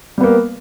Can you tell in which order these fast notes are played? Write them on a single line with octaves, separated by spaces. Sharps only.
G3 B3 A#3